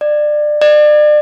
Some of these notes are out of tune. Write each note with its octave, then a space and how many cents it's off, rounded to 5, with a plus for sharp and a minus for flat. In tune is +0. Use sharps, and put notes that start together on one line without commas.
D5 +25
D5 +35